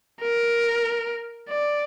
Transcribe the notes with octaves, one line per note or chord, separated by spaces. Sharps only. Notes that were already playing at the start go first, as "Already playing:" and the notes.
A#4
D5